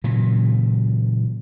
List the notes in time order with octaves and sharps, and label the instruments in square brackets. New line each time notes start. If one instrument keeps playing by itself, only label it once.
[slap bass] A#2 C#3 E3 F#3